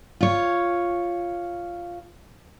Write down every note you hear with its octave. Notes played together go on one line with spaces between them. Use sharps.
F4 C#5